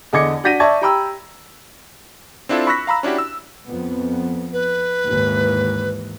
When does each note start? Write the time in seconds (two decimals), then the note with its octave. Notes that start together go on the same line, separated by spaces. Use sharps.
0.13 E2 D3 D#5 D6 G#6 C#7
0.44 D4 F#4 G6 A#6 B6 D#7
0.60 D5 E5 A5 C#6 G#6
0.81 G4 G5 A#5 B5 E6
2.49 C4 D4 E4 F4 A4
2.67 B5 C#6 E6 F#6 A#6 B6
2.87 F5 A#5 B5 E6
3.03 C#4 D4 E4 F#4 G4
3.18 E6
3.68 F2 B3
4.53 B4
5.06 D#2 G#2 E3